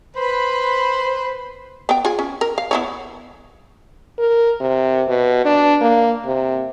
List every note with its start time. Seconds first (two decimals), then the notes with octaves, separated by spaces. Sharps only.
0.16 B4 C5 B5
1.89 B3 G5
2.05 F4 G#4
2.19 C#4
2.41 A#4
2.58 F5
2.71 B3 E4 C#5
4.18 A#4
4.60 C3
5.08 B2
5.45 D4
5.81 A#3
6.26 C3